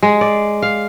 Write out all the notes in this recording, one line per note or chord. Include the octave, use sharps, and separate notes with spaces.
G#3
D5
F5